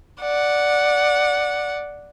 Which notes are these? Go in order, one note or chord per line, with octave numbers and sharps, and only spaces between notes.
D5 F#5